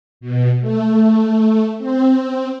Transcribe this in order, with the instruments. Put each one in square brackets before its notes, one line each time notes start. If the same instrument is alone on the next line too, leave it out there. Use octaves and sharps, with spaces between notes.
[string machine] B2
A3
C4